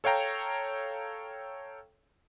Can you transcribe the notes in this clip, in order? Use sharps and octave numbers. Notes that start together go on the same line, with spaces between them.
A4 C#5 F5 G5 A#5